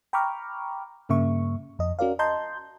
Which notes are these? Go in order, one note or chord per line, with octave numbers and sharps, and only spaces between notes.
G5 A#5 B5 C#6 D6 F6
G2 C#3 A#3 E5 C#6
F2 D#5
C#4 F#4 A#4 D5 F5
D#5 A5 A#5 C6 G6